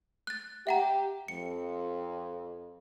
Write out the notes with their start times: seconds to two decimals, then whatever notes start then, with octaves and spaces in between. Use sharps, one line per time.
0.27 F#6 A6
0.67 G4 E5 F#5 A#5
1.28 F2 C#7